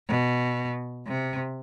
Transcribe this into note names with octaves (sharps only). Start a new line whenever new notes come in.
B2
C3